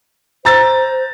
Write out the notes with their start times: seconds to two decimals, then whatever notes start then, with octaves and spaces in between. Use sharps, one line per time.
0.45 C5 A#5 E6 A6